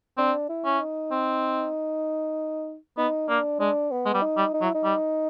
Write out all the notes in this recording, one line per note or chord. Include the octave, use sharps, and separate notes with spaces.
C4 D4
E4
C#4
D#4
C4
B3 D#4
A#3 D4
G#3 D4
B3
G#3
G3
D#4
G3
D#4
F#3 E4
D#4
G3